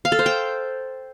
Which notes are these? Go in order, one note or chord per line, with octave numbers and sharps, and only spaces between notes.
F5
A4
C5
G5